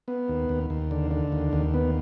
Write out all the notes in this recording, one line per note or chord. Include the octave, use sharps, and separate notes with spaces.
B3
D#2
D#2
D#2
D3
D3
D#2
D#2
B3